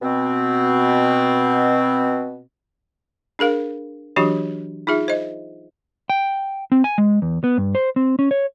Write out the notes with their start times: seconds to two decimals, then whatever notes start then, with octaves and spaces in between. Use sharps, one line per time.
0.02 B2 C4
3.39 D4 G#4 A#4 F5
4.16 E3 F#3 D4 F#4 G4 C#5
4.87 D#4 F4 G#4 E5
5.08 C5 D#5
6.10 G5
6.72 C4
6.84 G#5
6.98 G#3
7.22 E2
7.44 B3
7.58 G2
7.75 C5
7.96 C4
8.19 C#4
8.31 C#5